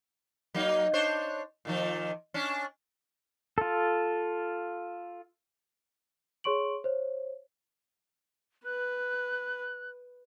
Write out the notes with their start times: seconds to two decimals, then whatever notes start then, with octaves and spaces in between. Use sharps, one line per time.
0.54 F#3 A#3 D#4
0.93 D4 C5 C#5
1.65 A#2 D#3 F3
2.34 C#4 D4
3.58 F4 A4
6.44 G#4 C#5 C6 C#6 D7 F#7
6.84 C5 C#5
8.65 B4 F#6